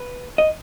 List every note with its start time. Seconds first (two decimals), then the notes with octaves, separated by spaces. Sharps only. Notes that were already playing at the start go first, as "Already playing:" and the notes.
Already playing: B4
0.38 D#5